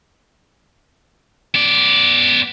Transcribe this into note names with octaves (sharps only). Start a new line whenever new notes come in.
B3 D5